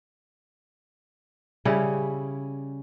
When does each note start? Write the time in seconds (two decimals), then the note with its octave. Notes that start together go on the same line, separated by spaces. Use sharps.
1.65 C#3 G3 C#4 E4